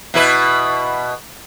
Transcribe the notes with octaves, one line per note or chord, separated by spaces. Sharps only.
B2 E4 B4